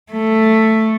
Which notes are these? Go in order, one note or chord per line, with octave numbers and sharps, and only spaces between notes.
A3